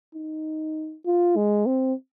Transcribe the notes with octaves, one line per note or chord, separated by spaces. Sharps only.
D#4
F4
G#3
C4